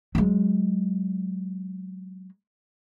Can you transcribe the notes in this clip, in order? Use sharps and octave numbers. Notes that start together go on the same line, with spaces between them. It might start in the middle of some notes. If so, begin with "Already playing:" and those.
F#3 G#3